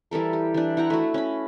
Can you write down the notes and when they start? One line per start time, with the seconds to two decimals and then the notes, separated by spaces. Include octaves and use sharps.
0.11 E3 G3 A4 A#4
0.33 G4
0.54 E3 D4
0.77 E4 F#5 G5 A#5
0.90 A3 F#4
1.14 C#4 B5